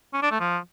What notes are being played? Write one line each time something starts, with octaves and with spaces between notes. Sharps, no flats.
C#4
D4
A3
F3